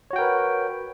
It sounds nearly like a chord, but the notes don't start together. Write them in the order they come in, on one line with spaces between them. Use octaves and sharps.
C#5 F#4 G5 A#4 B4